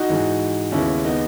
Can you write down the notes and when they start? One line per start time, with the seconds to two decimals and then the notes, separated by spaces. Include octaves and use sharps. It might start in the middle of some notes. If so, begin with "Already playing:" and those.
Already playing: D#4 F#4
0.09 G#2 E3 G#3
0.72 D#2 C#3 G#3 B3 C#4 E4
1.05 B3 D#4